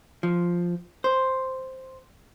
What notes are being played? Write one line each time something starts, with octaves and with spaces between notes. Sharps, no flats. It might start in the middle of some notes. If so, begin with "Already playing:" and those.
F3
C5